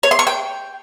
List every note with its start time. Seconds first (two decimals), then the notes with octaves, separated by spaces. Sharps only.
0.03 C#5
0.11 C6
0.19 C#6
0.27 G5